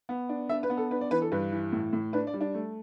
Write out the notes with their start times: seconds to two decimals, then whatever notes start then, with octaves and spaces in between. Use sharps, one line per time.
0.09 B3
0.29 D4
0.49 D4 E5
0.63 B4
0.70 B3
0.77 A4
0.91 D4 B4
1.01 D5
1.11 E3 B4
1.22 A4
1.32 G2 B4
1.52 E3
1.72 A2
1.93 A2
2.13 D4 B4
2.27 D5
2.33 G3
2.41 D4
2.54 A3